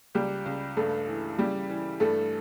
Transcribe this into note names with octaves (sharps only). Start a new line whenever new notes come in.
C#2 G3 G4
C#2
G2 A3 A4
E3
C#3 G3 G4
E3
G2 A3 A4